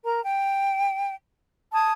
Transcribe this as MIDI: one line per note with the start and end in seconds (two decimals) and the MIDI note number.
0.04 0.21 70
0.04 0.21 82
0.23 1.14 79
1.73 1.93 81
1.73 1.93 87
1.73 1.93 92